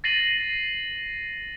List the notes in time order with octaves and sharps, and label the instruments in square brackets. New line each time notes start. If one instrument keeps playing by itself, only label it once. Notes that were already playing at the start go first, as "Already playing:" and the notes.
[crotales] A6 A#6 C7 D#7 F#7